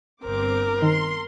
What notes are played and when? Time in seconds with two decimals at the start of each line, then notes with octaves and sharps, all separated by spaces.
0.24 G1 C4 A#4 D6
0.82 D#3 C6